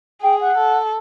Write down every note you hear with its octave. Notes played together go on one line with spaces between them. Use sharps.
G#4 G5
F#5
A4